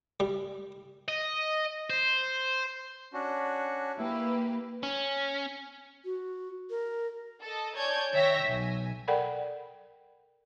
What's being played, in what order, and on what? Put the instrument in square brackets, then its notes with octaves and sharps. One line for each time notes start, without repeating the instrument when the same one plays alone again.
[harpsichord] G3
[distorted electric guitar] D#5
C5
[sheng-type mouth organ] C#4 D4 F#4
[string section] A#3 G4 B4 [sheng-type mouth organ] E4
[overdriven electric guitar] C#4
[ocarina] F#4
A#4
[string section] A4 D#5
C#5 D5 G#5 A5 G6 G#6
D#3 C#5 E5 G5 A#6
B1 G#5
[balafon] A4 A#4 D5 F#5 G5 B5